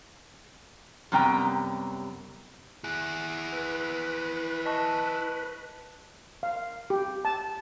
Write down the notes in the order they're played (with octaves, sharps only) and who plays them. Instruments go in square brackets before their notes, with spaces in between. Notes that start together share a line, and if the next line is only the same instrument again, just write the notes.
[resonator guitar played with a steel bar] F#2 C3 G3 B3 G5 A#5
[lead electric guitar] E4 G#4 [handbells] F#6
[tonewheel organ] B4
[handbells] D#5 A5 C#6
[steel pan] F5
G4
A5